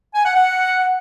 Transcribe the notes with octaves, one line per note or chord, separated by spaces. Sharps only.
G#5
F#5
F#5